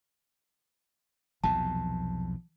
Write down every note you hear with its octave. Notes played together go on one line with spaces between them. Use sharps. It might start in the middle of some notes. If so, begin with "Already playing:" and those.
B1 E2 C3 F3 A5